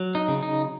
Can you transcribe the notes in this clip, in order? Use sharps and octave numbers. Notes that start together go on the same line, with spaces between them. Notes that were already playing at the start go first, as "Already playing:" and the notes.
Already playing: F#3
D#4
C#3
D#4